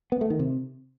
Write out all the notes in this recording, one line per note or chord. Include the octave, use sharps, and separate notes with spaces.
B3
A3
D#3
C3